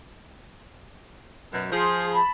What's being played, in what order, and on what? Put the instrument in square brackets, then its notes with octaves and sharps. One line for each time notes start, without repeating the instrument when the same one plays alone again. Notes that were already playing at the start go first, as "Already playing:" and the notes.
[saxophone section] F#2 B2
[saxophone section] F3 G#4 [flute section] C6
[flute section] A5 B5